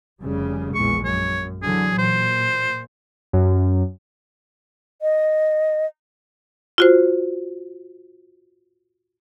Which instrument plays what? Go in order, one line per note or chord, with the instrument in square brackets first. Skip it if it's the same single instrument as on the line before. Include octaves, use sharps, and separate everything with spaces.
[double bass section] F1 C#3 G3
[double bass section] A#1 E2 G#3 [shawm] C#6
[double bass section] F#2 [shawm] C#5
[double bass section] D3 E3 F#3 [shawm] G#4
[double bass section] A#2 [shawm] C5
[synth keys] F#2
[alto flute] D#5
[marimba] F4 F#4 C5